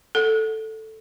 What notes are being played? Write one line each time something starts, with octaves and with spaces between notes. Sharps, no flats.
A4 F#5